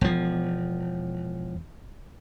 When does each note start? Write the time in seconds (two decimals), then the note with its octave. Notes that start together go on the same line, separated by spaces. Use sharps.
0.01 E1 F3